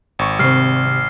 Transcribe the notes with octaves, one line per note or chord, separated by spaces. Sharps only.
G#1 C#6
C3 G3 C4 F6 C7